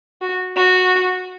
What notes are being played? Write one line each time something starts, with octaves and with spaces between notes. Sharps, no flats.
F#4
F#4